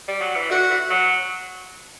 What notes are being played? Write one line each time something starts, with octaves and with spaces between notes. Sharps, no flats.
G3
F#3
E3
D3 F#4
E3
F#3